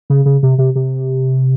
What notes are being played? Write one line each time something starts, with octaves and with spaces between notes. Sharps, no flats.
C#3
C#3
C3
C3
C3